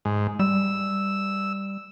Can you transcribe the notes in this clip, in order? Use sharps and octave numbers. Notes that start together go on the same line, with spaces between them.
G#2
G3 E6